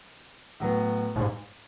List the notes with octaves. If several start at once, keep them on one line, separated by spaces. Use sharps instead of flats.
A2 F#3 B3
A2
G#2